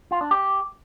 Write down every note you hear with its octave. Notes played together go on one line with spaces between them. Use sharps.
F4
D4
G4